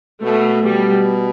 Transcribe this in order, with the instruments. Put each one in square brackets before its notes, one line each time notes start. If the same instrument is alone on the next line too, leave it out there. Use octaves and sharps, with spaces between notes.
[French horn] B2 [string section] A3
[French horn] B2 [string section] G3